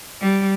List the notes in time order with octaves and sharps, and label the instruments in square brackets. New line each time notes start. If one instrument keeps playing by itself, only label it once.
[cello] G3